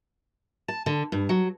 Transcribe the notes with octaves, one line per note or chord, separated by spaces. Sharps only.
A5
D3
G2
F#3